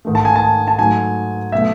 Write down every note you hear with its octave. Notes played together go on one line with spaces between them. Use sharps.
G#2 D#3 A3
A5
G#5
A5
A5
G#2 F#3 A3 G#5
B2 F#3 A3 E5